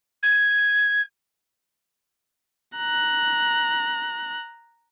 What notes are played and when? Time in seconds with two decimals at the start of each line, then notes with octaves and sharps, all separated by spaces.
0.22 G#6
2.77 A#5 F#6